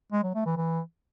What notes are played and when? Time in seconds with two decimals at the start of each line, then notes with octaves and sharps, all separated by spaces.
0.12 G#3
0.24 F#3
0.35 A3
0.46 E3
0.57 E3